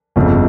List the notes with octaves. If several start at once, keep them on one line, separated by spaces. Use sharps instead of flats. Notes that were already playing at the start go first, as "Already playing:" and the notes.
G1 F2 C#3